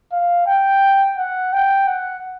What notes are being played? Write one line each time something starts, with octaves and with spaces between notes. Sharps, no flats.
F5
G5
F#5
G5
F#5